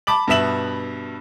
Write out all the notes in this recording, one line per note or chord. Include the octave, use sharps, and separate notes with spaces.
A5 B5 D6 F#7
G2 B2 B3 E5 E7 F#7